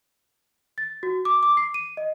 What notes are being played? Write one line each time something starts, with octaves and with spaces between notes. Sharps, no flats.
A6
F#4
D6
D6
C7
D#7
D#5